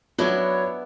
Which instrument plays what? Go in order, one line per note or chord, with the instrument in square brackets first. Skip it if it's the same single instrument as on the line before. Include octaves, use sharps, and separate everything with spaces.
[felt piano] F#3 [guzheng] B3 D4 E4 [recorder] C#5